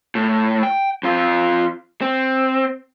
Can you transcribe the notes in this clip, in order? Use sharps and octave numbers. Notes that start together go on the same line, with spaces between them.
A2
G5
F2 F4
C4